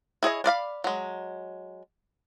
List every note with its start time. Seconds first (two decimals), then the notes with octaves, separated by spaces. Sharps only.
0.23 E4 G#4 C#5 D#5
0.44 D4 D5 F5 B5
0.84 F#3 G#3